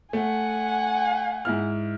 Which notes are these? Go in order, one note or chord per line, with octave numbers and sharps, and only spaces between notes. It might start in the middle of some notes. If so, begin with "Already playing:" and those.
A3 F#5 G#5
G#2 E4 F6